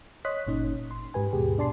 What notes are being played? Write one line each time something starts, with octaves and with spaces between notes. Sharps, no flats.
C#5 D#5 C6 D#6 F#6 B6
G1 A#2 C#4 D#4
C6
G#2 G4 B4 G#5
D#2 G#2 B2 G4 G#4
B2 D4 D5 A5 C6 C7